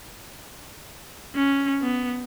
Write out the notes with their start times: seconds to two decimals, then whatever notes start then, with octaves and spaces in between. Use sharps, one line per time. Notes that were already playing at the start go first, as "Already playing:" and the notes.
1.35 C#4
1.82 B3